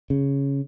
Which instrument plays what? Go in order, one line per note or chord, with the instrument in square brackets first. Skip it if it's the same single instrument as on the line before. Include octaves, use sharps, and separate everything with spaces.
[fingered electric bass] C#3